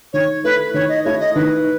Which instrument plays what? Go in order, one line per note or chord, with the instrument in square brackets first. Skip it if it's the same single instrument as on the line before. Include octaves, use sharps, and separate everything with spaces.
[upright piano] D#3 [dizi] C#5
[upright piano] A3 E4 A4 [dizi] B4
[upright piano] D#3 [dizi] C#5
[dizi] D#5
[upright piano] A3 E4 A4 [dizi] C#5
[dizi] D#5
[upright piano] D#3 [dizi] B4